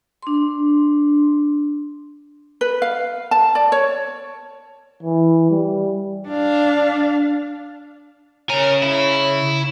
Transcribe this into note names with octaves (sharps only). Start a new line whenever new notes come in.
D4 C6
B4
F5
A5
D5
C#5
E3
G3
D4 F5
C#3 A#4 C#5 G#5
E4